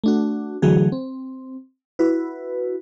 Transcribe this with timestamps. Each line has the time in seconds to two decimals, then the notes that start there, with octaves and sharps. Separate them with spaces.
0.04 A3 D4 F#4
0.62 D3 E3 F#3 A3 F#4 G#4
0.92 C4
1.99 E4 F#4 B4